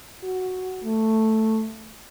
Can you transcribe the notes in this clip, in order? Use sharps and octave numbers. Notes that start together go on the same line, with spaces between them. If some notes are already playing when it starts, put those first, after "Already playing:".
F#4
A3